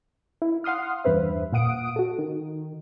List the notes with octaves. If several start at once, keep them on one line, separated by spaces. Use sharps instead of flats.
E4
F5 F#5 C6 D#6 F6
E2 G2 B4 C5 E5
A#2 F5 F#5 D#6 D7
F#4 A4
D#3